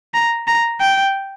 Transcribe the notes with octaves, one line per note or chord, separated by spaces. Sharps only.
A#5
A#5
G5